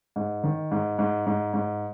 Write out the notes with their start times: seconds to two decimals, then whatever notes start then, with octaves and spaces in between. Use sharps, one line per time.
0.16 G#2
0.44 D#3
0.71 G#2
0.99 G#2
1.26 G#2
1.54 G#2